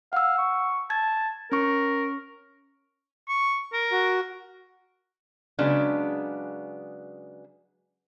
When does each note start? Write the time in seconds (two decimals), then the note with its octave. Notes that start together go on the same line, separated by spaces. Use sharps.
0.13 F5 F#5 E6
0.38 C#6
0.90 A5 G#6
1.52 C#4 A#4 C#6
3.28 C#6
3.73 A#4
3.92 F#4
5.59 C#3 F#3 G#3 B3 D4